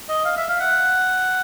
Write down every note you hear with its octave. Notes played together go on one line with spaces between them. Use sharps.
D#5
F5
E5
F5
F#5